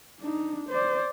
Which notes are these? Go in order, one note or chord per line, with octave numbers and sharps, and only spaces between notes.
D4 D#4
C5 D5